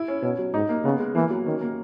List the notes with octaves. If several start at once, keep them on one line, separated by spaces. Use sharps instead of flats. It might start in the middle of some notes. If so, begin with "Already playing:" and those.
Already playing: E4
C#4
B2 C#4
F#3
G#2 D#4
A#3
C#3 B3
G#3
E3 A#3
F#3
D#3 C#4
A#3